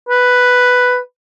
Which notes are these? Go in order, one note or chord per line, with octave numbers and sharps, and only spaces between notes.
B4